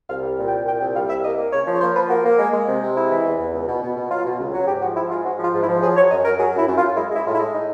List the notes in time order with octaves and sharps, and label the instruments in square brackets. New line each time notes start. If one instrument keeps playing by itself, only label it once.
[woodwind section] C2 F5
G3
A#2
G5
C2
A#2 G5
C2 G5
G3 F5
C2 E5
A#3 D#5
A#3
C#3 C#5
F3
C#5
A#3 C5
F3 B4
A#3 F#4
A#3
G#3
G#3
C3
C3
G#3 E4
E3
E2
E2
C#2
B2
B2
B2
F#3 F4
B2
C#2
F#3
G#2 G4
F3 F#4
G#2 E4
G#3 F4
G#2 F#4
F3 F4
G#2
E4
F3
F#3 G#4
F#3 C#5
F#2 D#5
F#2 A#4
F#3 G#4
F#2 E4
F#2
F4
F#2
G#3 E4
G#3 E4
A2 F4
E4
G#3
A2 D#4